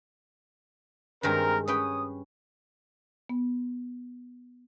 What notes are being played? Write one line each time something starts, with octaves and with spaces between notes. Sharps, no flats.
G2 D#3 G#3 C4 A#4
C#4 B4 C#5 G5 D#6
B3